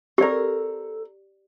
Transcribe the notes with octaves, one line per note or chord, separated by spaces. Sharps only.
C4 G4 A4 A#4 D5